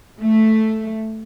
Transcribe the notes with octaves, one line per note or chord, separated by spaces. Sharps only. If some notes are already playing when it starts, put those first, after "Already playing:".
A3